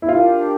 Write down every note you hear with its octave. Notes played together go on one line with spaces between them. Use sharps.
E4
D4 F4 G4 A#4